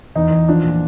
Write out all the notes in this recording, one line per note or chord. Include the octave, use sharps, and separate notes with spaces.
E2 D#4
E2
F3 D4
A#2